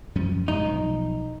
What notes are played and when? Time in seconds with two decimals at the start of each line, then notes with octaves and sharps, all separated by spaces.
0.15 F#2 F3 C#4
0.48 G#2 C3 G#3 D#4
0.64 B1 F3